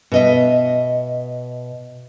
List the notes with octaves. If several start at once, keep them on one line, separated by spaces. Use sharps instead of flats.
B2 D#5 E5